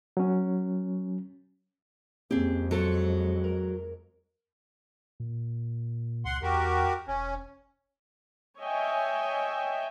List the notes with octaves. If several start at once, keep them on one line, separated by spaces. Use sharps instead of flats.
F#3 C#4
F2 G#3 A#3 C4 C#4 G4 G#4
F#3 A4 C5 C#7
A#4
A#2
C#2 F#5 C6
E2 F#4 G4 A#4
E1 C#4
C#5 D#5 E5 G5 G#5